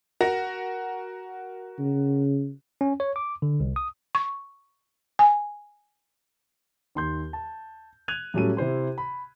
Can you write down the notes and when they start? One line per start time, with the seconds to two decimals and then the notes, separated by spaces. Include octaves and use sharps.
0.21 F#4 A#4 A#6
1.79 C#3
2.81 C#4
3.00 C#5
3.16 D6
3.42 D3
3.60 C2
3.76 D#6
4.15 C#6
5.19 G#5
6.95 D#2 C6 G6
7.33 A5
8.08 F#6 G#6 D#7 F7
8.34 A2 F#3 G3 C#4 A4 D#7
8.57 C3 E4 C5 C6
8.98 B5